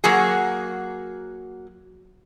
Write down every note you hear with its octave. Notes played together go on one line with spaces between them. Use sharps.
F#3 A#3 F#4 G#4